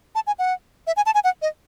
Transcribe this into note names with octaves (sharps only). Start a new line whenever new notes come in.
A5
G#5
F#5
E5
G#5
A5
G#5
F#5
D#5